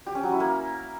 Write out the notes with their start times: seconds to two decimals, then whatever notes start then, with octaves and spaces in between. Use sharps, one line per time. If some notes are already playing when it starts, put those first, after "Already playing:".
0.07 G4
0.15 C#4
0.23 F#3
0.32 E4
0.40 A#3